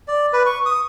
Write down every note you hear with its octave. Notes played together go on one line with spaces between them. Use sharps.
D5
B4
C#6
D#6